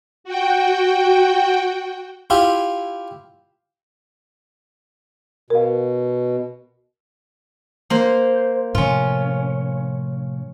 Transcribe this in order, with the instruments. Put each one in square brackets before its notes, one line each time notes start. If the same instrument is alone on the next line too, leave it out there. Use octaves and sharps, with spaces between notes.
[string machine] F#4 G5
[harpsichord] E4 F4 G4
[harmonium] B2 [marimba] A#4 F5
[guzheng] A#3 C5
[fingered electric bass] A2 C3 F3 [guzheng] C#4 F4